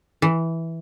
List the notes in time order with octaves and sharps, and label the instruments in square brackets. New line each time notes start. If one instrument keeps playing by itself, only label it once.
[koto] E3